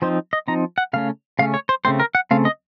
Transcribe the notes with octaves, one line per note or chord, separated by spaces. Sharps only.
F3 C4 D#4 C5
D#5
F3 C4 D#4 A#5
F#5
C#3 A3 C#4 F5
C#3 A3 C#4 F5
C#5
C5
C#3 A3 C4 C5
A#4
F#5
C#3 A3 C4 F5
D#5